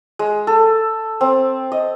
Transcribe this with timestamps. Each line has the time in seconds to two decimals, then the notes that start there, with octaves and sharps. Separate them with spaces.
0.19 G#3
0.47 A4
1.21 C4
1.72 D#5